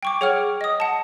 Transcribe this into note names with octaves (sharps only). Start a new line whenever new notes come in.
G5 C#6 D6
G#4 C#5 F#5 G5 F6
D#5 D#6
F#5 A5